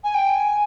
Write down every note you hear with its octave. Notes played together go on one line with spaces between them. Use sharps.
G#5
G5
G#5